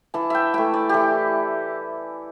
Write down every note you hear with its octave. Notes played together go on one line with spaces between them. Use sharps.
E3 A5
E5 G5
A3 E4 G5
D5
E3 G4 A4